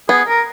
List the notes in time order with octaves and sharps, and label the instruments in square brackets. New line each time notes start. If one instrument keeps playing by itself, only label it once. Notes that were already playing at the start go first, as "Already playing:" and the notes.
[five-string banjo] B3 [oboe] G#4
[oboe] A#4